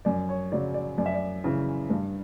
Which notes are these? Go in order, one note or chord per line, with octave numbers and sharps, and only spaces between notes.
F#2 D5
C#5
C#3 F#3 D5
D5
F#2 D5
E5
D5
C#3 E3
G2